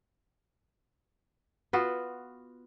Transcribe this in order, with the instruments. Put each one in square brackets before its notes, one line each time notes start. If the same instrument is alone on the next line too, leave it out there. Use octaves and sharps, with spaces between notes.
[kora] B3 F4 F#4